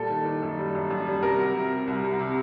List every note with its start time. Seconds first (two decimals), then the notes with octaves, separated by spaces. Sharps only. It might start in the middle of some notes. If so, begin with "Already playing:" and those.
Already playing: A#2 G3 A4
0.10 D#3
0.25 D#3
0.42 F#2
0.58 G3
0.75 F#2
0.90 F#2
1.06 G3
1.23 C3 A#4
1.39 F#3
1.55 C3
1.72 C3
1.87 C2
2.04 C3
2.19 C3